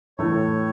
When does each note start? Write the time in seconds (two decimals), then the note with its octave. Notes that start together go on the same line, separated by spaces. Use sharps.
0.18 A2 E3 A3 C#5